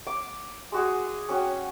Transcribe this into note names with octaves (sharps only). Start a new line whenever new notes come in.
D6
G#3 F#4 G#4
C#4 F#4 C#5 G5